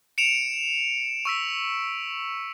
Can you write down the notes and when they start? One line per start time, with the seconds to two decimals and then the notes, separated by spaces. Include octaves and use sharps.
0.18 C#7 D7 E7 F7
1.25 C#6 E6 B6